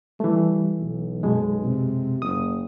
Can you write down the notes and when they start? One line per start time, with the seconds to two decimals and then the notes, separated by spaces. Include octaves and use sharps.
0.20 E3 G3 A3
0.79 B1
1.23 F#2 B2 G#3
1.64 C3
2.22 F#1 D#6